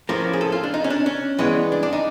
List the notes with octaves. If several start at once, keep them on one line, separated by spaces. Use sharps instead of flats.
A2 F3 A#3 C#4
G#4
A4
F4
D4
D#4
C#4
D4
C#4
G2 E3 G#3 B3
D4
D4
D#4